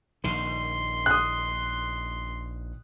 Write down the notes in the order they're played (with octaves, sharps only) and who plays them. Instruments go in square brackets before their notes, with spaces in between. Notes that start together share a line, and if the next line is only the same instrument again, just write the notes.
[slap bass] A#1 D#3 [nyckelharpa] C6
[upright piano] D#6 F#6